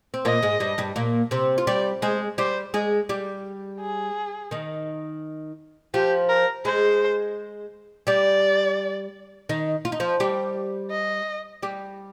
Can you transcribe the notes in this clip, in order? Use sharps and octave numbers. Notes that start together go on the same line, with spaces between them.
C4
A#2 A#3 D#5
G#2 G#3
G2 G3
G2 G3
A#2 A#3
C3 C4
F4
G3 G4 D5
G#3 G#4 C5
G3 G4 C5
G#3 G#4
G3 G4
G#4
D#3 D#4
F3 F4 G4
A#4
G#3 G#4 C5
G3 G4 D5
D#3 D#4
F4
D#4
F3 F4
G3 G4
D#5
G3 G4